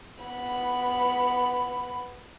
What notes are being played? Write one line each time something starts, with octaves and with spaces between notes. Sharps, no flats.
B3 B5